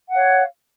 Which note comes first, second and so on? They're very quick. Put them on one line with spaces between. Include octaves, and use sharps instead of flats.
F#5 F5 C#5